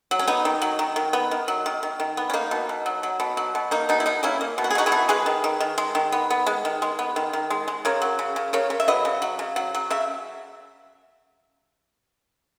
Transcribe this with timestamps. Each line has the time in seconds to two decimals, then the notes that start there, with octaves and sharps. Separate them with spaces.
0.11 F#3
0.19 C#4
0.27 B3 D#4
0.45 D#3
0.62 F#3
0.79 D#3
0.96 D#3
1.13 B3
1.31 D#3
1.48 F#3
1.66 D#3
1.83 D#3
2.00 D#3
2.17 B3
2.30 C#4
2.34 A#3 D#4
2.51 B2
2.69 B2
2.86 F#3
3.03 F#3
3.20 B2
3.37 F#3
3.55 B2
3.71 A#3 D#4
3.89 B2 D#4
4.00 E4
4.06 B2 D#4
4.23 A#3 C#4 E4
4.41 A#3
4.58 B2
4.64 F#4
4.71 G#4
4.75 B2 D#4 F#4
4.86 E4 G#4
4.92 B2
5.09 G#3 G#4 B4
5.26 D#3
5.44 D#3
5.60 D#3
5.78 G#3
5.95 D#3
6.12 B3
6.30 B3
6.46 G#3
6.65 D#3
6.82 G#3
6.99 B3
7.16 D#3
7.33 D#3
7.50 G#3
7.68 G#3
7.85 C#3 A#4 C#5
8.02 F#3
8.19 C#3
8.36 C#3
8.53 C#3 A#4 C#5
8.70 C#3
8.80 E5
8.88 F#3 B4 D#5
9.05 C#3
9.22 F#3
9.39 C#3
9.56 F#3
9.75 F#3
9.90 C#3 E5